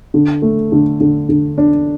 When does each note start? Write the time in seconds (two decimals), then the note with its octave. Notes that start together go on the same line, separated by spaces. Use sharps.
0.14 D3
0.42 A3
0.72 D3
1.01 D3
1.29 D3
1.58 D4